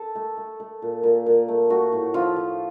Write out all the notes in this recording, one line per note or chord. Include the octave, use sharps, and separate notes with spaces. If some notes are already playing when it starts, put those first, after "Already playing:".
Already playing: A4
A3
A3
A3
A#2
A#2
A#2
A3
A3 F#4
A2
F3 F4
F3